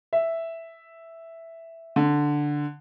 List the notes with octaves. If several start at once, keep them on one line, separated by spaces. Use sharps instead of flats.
E5
D3